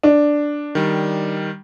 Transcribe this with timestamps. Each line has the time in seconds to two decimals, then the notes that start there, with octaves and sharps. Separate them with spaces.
0.03 D4
0.75 D#3 G3